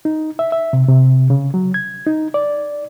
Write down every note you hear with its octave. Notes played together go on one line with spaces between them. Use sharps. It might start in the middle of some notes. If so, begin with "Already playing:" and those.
D#4
E5
E5
C3
C3
C#3
F#3
G#6
D#4
D5